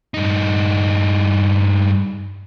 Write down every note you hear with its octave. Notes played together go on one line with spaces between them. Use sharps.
G2 D#4